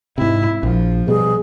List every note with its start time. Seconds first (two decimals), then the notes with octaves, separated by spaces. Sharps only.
0.18 G#2 C3 E4
0.63 A#1 F3
1.08 B2 G3 G#4